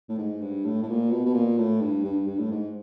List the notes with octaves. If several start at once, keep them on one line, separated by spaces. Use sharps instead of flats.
A2
G#2
G2
A2
A2
A#2
B2
B2
A#2
A2
G2
G2
G2
A2
G#2